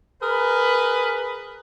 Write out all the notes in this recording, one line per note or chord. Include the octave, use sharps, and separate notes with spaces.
G#4 A#4 B4